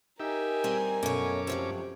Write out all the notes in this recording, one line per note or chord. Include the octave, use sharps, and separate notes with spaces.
D#4 G4 A#4 E5 G#5
G3 C4 G#4
F#2 B2 A3 C#4 C#5 D6
F2 C3 E3 F#3